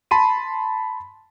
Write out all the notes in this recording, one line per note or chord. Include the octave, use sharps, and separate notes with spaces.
A5 B5 C6 D#7